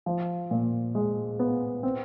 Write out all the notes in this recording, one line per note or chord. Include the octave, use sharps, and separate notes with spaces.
F3
A#2
G#3
B3
C4